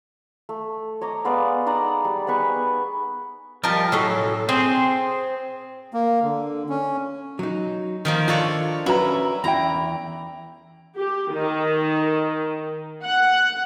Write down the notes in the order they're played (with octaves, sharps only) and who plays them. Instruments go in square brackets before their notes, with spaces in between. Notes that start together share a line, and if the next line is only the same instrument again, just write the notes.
[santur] A3
C#5 D#5 A#5 D6
G#3 B3 D5 F5
D#4 D5 F#5 A#5
G3
B3 G#4 B4 C#6
[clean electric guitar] F3 G3 [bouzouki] A#4 D#5 A5
[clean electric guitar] A2 [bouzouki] F#3 C#4 A4
[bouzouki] C4 [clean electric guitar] G#4 C5
[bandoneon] A#3
D3
C#4
[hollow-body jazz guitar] F#3 D#4
[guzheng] D#3 F3 A#3
[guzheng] D4 A4 C#5 [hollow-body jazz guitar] F4
[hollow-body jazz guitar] C#4 [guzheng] E4 [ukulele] F#4 B4 A#5
[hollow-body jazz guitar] E2 E4 [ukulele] G5 B5 [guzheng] A#5
[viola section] G4
D#3
F#5